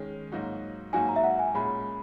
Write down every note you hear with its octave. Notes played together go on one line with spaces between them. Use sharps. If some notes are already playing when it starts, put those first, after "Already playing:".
Already playing: D#3 G#3 C#4 G#4
G#2 F#3 A#3 D#4 F#4
G#2 F#3 A#3 D#4 F#4 G#5
A#5
E5
F#5
G#5
A#2 G#3 C#4 B5